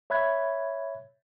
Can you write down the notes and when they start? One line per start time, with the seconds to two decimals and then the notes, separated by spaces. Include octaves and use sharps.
0.10 C#5 E5 B5 F#6 G#6